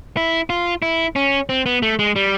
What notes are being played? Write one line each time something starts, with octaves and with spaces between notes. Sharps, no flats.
E4
F4
E4
C#4
C4
B3
A3
G#3
G3